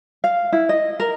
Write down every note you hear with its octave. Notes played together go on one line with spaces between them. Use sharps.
F5
E4
D#5
A#4